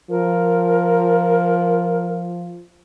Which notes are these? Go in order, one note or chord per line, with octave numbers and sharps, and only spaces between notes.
F3 A#4